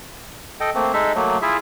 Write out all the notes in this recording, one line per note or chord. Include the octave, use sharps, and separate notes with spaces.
A4 D#5 G5
A3 A#3 C4
G#3 D#4 A4 E5
F#3 A3 A#3
E4 F4 G#4 E5